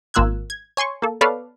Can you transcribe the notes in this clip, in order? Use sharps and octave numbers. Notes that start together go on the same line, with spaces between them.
G#1 A#3 F4 E6 F#6 G#6
G#6
C#5 G#5 C6 C#6
A#3 A4
B3 A4 B4 C#5 D5 F5